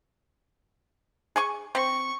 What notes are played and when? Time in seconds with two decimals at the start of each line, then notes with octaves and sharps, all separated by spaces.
1.36 G#4 G#5 C#6
1.75 C4 C#6